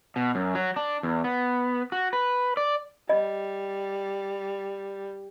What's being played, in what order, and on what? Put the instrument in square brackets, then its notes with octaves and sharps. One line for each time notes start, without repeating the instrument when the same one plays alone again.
[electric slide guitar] B2
F#2
F#3
D4
E2
B3
F#4
B4
D5
[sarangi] G3 [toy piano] D#5